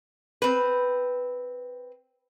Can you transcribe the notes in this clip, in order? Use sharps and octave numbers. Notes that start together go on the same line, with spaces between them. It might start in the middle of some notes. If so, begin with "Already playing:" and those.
C4 B4